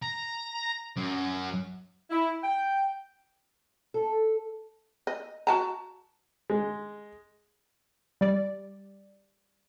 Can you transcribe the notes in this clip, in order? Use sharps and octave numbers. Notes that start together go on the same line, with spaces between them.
A#5
F#2
E4
G5
A4
D#5
F#4 A5 A#5
G#3
G3 D5